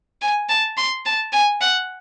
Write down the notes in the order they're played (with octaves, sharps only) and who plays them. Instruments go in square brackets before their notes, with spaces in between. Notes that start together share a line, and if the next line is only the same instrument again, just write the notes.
[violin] G#5
A5
C6
A5
G#5
F#5